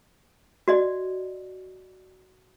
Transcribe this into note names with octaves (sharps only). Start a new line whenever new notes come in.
F#4 D5 D#5